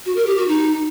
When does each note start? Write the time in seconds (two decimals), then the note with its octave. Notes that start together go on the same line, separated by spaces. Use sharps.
0.06 F#4
0.16 A#4
0.27 G4
0.37 F#4
0.48 D#4